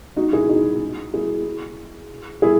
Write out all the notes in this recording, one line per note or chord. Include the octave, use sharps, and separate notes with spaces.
D#4 F#4
E4 G#4
D#4 F#4
E4 G#4
E4 G#4